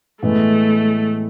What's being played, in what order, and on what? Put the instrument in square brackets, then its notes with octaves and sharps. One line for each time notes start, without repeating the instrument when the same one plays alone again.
[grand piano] A2 E3 G#3 B3 [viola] A3